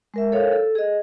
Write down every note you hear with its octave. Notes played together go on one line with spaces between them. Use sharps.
G#3 A#4 E5
A4 A#4 C#5 F5
A4
G#4 D#5